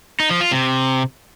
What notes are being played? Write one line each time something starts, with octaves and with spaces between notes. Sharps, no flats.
D#4
F3
F4
C3